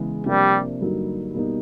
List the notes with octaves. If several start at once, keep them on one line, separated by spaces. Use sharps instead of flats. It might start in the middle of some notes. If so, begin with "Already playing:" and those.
Already playing: C#3 E3 G#3 B3
C3 F3 G3 A#3 D4
G2 D3 F#3 A#3 D#4
B2 G3 A#3 D#4